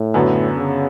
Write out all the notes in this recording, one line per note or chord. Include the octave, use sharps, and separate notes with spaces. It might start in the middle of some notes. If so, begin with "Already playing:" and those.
Already playing: A2
F#2 D3 F#3 B3
C#3